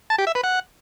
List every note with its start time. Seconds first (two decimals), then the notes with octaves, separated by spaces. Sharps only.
0.10 A5
0.18 G4
0.27 E5
0.35 B4
0.44 F#5